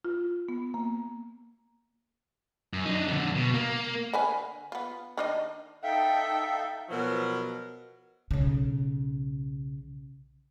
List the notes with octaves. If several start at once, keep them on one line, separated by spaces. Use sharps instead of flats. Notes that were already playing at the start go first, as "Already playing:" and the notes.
F4
B3
A#3
F#2
D4 D#4
F2 D3
B2
A#3
D3 B4 G#5
B3 F4
D#3 D4 D#5
D#4 A4 E5 F5 G5
B2 F3 F#3 A#4
B1 C#3